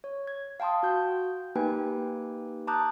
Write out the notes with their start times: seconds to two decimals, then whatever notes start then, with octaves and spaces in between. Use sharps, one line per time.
0.04 C#5
0.27 G#6
0.60 F5 G5 A5 C6 D#6
0.83 F#4 G6
1.55 A#3 D#4 G4 B4 G5 G#5
2.67 A5 A#5 D6 D#6 F#6 G6